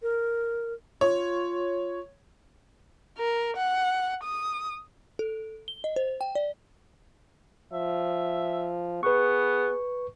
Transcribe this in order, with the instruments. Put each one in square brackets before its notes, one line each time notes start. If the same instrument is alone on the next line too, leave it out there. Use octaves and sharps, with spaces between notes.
[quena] A#4
[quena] F4 [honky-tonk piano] C#5
[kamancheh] A#4
F#5
D#6
[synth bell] A4
G7
D#5
C5
G5
D5
[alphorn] F3 [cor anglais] E5
[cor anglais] B3 [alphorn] G#4 [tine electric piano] B4 C#6